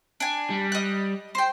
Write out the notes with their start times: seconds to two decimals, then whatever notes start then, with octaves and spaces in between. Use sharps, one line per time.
0.20 D4 G#5
0.51 G3
0.72 D#5 F#6
1.35 C5 G5